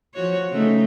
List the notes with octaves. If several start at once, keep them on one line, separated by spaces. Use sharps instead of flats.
F3 F#4 C#5
C#3 A3 D#4